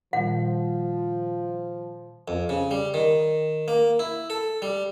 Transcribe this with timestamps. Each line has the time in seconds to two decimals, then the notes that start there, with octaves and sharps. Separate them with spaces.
0.13 A#2 D#3 F3 G3 F#5
2.28 F2
2.49 C#3
2.71 G3
2.94 D#3
3.68 A#3
3.99 E4
4.30 A4
4.62 G3